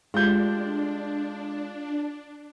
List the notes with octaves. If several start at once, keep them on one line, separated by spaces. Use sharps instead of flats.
G#3 A3 D4 F4 G4 G6